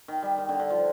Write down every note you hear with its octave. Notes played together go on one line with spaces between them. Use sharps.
D#3
G3
D#3
D3
D3
F3